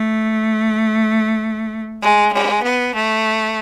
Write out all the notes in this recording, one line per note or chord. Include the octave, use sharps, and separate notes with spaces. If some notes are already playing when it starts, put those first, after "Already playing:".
Already playing: A3
G#3
G#3
B3
A3